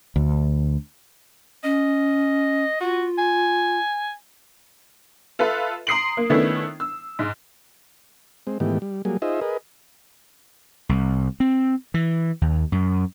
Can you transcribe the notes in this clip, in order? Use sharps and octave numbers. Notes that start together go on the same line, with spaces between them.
D2
C#4 D#5
F4 F#4
G#5
F4 A4 B4 E5
A#5 C6 D#6 C7 D7 F#7
A#3
D#3 A3 B3 C#4 D4 E4
E6
G#2
G#3 C4
G#2 D#3 E3 A3 B3 G4
G3
F#3 G3 A#3 G#4
D#4 F4 G#4 C5 D#5 E5
G#4 A#4 B4 D#5
C2
C4
E3
D#2
F#2